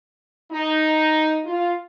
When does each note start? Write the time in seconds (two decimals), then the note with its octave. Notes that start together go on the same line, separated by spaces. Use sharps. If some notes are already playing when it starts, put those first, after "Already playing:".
0.52 D#4
1.45 F4